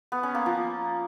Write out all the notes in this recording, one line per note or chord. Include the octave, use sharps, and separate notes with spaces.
B3
C#4
A#3
F3